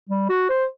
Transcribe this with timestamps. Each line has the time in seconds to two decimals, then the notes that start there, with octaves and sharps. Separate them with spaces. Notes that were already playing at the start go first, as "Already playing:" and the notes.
0.09 G3
0.29 F#4
0.49 C5